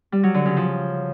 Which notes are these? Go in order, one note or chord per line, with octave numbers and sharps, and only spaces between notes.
G3
F#3
D3
C#3
F3